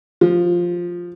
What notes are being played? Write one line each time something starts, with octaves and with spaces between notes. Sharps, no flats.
F3